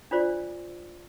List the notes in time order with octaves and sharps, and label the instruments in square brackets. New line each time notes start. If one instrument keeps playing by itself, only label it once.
[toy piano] D4 F4 C5 D5